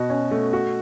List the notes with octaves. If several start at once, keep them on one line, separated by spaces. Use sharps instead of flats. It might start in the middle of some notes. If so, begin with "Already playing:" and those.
Already playing: B2 F#4
C#4
A3
F#4